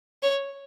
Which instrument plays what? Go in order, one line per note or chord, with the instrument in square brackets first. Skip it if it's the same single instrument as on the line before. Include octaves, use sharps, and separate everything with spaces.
[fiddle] C#5